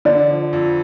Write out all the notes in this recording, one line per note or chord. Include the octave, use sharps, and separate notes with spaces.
D3 D5
F3
F2